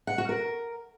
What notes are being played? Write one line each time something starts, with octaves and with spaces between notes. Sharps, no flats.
F#5
F#4
A#4